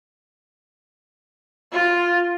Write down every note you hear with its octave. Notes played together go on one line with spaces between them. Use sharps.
F4